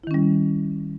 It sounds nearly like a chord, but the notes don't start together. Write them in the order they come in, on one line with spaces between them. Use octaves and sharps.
E4 D#3 C#4 G3